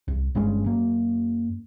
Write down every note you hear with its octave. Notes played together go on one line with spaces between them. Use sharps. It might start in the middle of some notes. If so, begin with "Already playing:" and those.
C2
G1 G2 G#3 C#4
F#2 A#3